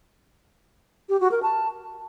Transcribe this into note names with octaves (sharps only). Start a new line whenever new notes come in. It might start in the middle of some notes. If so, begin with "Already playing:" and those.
G4
F#4
A#4
A5